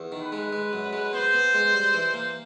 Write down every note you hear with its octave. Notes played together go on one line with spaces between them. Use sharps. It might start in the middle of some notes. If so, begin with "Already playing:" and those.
Already playing: E2
D#3
B4
G#3
G#3
F#2
G#3
B3 C5
B3
G#3
G3
E3
A#3